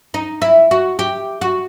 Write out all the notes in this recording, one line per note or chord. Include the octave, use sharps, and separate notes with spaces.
D#4
E4
F#4
G4
F#4